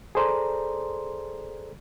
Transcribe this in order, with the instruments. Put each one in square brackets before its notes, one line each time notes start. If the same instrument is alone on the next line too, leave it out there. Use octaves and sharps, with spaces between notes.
[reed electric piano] G#4 A4 C5 D5 A#5 C6